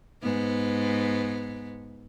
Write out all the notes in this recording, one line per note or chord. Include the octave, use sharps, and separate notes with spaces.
G#2 B3